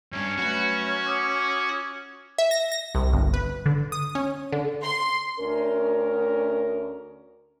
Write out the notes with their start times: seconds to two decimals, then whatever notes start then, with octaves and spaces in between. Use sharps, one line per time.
0.13 B1 G2 C#4
0.38 F#3 A3 F#4 B4
1.07 D6 D#6
2.38 E5
2.51 A#6
2.72 A#6
2.95 C2
3.13 G1
3.34 B4
3.66 D3
3.92 D#6
4.15 C#4
4.53 D3
4.82 C6
5.40 D2 C#4 A#4